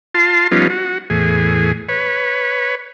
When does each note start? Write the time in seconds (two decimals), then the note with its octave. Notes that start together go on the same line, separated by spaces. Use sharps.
0.15 F4 A5 C6
0.51 F3 G3 B3 C#4 D#4 F4
0.70 F#4
1.10 E2 A2 G#4
1.89 B4 C#5